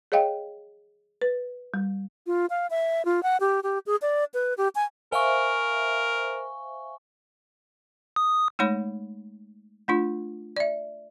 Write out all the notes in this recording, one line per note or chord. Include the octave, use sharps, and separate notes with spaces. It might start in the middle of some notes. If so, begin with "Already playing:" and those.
G#4 C#5 D#5 F5 G5
B4
G3
F4
F5
E5
F4
F#5
G4
G4
G#4
D5
B4
G4
G#5
A#4 C5 E5 F5 G#5 C#6
D#6
G#3 A3 D#4 C#5 B5
A3 D4 F4
D5 E5